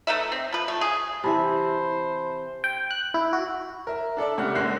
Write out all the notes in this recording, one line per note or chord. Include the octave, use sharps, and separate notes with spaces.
A3 D#4 B4 E5
C4
F3 B4
A3
G#4
C3 E3 C5 E5 A5 B5
G5
F#6
E4
F#4
A#4 E5
D4 A4 D5 E5
C#2 C3 A3 F#5 F6
G1 G#3 A#3 E6 F#6 C7